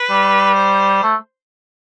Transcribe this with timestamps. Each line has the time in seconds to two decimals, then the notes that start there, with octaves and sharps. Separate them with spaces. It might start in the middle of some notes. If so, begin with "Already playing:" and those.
Already playing: B4
0.10 G3
0.56 C5
1.03 A3